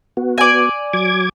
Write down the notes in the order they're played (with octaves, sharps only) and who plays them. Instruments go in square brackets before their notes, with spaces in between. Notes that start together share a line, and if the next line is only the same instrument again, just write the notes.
[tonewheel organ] B3 F#4
[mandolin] D5 G#5
[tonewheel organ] F#3 D6 G#6